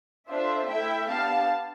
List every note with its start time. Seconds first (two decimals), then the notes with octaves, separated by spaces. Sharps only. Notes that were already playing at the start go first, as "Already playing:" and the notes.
0.28 D4 F4 A4 C5 E5
0.68 A3 E4 A4 E5 G5
1.08 B3 D4 G4 F5 A5